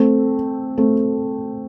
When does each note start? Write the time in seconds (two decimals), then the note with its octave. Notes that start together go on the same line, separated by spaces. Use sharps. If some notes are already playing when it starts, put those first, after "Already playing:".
Already playing: A3 C4
0.78 A3 C4